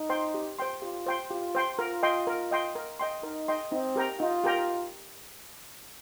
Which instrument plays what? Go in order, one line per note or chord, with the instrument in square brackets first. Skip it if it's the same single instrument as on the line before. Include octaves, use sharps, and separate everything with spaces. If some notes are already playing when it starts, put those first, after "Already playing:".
Already playing: [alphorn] D#4
[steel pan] C5 G5 C6
G4
C5 G5 C6
[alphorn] F4 [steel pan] G4
[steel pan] C5 G5 C6
[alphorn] F4 [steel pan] G4
[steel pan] C5 G5 C6
[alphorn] F4 [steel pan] A#4
[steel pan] D#5 G5 C6
A#4
D#5 G5 C6
A#4
D#5 G5 C6
[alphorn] D#4 [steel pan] A#4
[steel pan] D#5 G5 C6
[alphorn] C4 [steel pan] D#4
[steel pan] G4 A#4 G5 A#5
[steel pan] D#4 [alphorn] F4
[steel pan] G4 A#4 G5 A#5